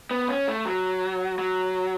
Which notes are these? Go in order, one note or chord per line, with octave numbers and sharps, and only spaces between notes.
B3
C#4
A3
F#3
F#3